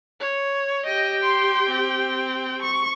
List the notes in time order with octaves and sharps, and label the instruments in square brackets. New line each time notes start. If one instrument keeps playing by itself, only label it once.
[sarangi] C#5
[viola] G4 G5 [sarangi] D#5
[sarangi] C6
C4
[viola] C#6